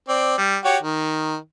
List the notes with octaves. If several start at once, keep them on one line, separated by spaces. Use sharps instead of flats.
C4 D5
G3
F#4 G4 C#5
D#3